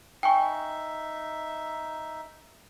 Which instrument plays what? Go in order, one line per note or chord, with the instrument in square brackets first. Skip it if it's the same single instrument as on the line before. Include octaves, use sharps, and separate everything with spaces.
[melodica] D#4 E5 [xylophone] G5 G#5 C#6